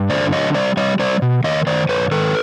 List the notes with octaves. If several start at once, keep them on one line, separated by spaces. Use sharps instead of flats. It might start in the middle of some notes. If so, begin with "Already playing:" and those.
Already playing: G2
D3 C5 D5
F#3 C#5 D#5
G3 C5 D5
G3 C#5 D#5
G3 C5 D5
B2
D#3 C#5 D#5
D#3 C5 D5
F#2 B4 C#5
D#3 A4 B4